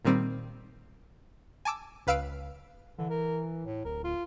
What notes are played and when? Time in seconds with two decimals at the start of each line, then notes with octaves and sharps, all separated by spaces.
0.05 A#2 D#3 G3 C4
1.65 G#5 A5 D6 E6
2.07 C#2 B4 F5 E6 D7
2.99 D3 E3
3.10 A#4
3.64 A2
3.85 D1 A#4
4.04 F4